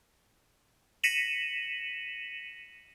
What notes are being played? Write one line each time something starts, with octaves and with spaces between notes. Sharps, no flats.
A#6 B6 C#7 D#7 E7 F#7